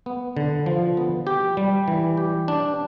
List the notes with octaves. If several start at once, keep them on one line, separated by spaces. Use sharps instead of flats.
B3
D3
F3
B3
G4
G3
E3
G4
D4